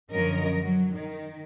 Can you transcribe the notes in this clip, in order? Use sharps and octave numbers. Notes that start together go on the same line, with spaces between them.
F#2 D3 F3 C#4 A#4 D#5
F#3
D#3